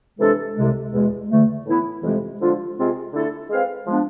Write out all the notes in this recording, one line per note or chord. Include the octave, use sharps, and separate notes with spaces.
C3 E3 G#3 D4 A4
C2 C3 G#3
E2 B2 G#3
E2 D3 A3
A2 E3 B3 E4 B4
F2 C3 E3 G#3
D3 F3 G#3 D4 F4
C3 G#3 C4 F4
D3 A3 E4 A4
G#3 C4 G#4 B4 F5
F3 G#3 B3 D4